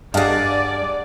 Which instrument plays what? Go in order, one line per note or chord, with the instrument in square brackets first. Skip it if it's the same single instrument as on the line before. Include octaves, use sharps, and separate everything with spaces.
[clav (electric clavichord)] G2 [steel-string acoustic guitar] G#4 F#5 [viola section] D5 [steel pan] D#5 F5 A5